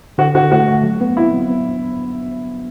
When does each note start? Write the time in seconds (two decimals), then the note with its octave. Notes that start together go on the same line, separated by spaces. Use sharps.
0.18 D3 F#4
0.35 D3 F#4
0.52 A3 F#4
0.68 A3
0.84 F#3
1.01 B3
1.17 C4 E4
1.33 F#3
1.49 B3
1.66 D4